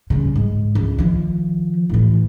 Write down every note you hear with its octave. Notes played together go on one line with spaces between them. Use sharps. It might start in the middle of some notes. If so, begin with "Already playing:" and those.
C#3 G3
G#2
C#2
D#3 F3
A2 E3